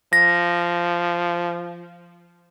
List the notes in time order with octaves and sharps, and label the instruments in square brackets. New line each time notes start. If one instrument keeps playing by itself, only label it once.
[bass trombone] F3 [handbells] A#6